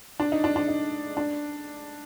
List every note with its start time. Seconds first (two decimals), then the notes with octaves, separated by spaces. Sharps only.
0.20 D4
0.32 D#4
0.44 D4
0.56 D4
0.68 D#4
1.17 D4